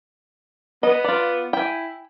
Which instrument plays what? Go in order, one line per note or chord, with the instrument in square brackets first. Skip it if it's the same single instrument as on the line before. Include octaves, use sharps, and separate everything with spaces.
[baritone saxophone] B3 [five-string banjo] D#5
[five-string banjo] F4 D5
[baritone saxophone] E4 [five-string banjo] G5 G#5